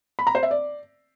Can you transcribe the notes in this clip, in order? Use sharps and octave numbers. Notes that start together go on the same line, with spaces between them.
B5
A#5
C5
E5
D5